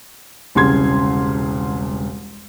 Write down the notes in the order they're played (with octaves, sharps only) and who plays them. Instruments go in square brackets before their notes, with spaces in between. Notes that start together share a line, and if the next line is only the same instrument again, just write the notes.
[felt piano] E1 C2 C#3 C6 G#6